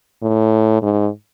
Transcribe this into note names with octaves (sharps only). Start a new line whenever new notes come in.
A2
G#2